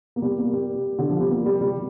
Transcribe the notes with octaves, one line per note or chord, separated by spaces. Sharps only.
A#3
G3
A#3
G3
D3
F3
G3
A#3
G3
G3